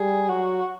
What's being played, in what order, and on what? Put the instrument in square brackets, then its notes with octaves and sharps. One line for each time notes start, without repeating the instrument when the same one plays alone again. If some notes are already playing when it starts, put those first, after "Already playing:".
Already playing: [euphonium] G3 [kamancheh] G#4
[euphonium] F#3 [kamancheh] F#4